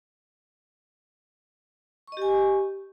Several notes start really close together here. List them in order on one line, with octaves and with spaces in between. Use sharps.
C#6 D#5 G4 G#5